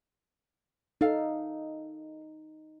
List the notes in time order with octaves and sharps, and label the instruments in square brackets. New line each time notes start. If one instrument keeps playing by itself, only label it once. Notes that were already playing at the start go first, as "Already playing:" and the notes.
[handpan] D#4 [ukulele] A4 F5